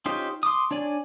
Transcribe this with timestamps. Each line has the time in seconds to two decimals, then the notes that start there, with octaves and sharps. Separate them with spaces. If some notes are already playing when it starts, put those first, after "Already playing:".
0.06 C#4 D#4 F4 G4 C5
0.43 C6 D6 D#6
0.71 D4 C#5 D5 G#5